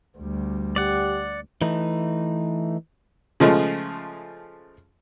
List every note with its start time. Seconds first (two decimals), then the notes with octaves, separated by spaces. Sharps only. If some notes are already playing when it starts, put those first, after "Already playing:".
0.18 D2 G3
0.76 G4 D5 F#5
1.62 E3 A3 D#4
3.40 C#3 F3 G#3 A3